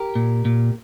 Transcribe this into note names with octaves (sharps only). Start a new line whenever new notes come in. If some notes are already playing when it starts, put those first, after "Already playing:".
Already playing: G4 A#4
A#2
A#2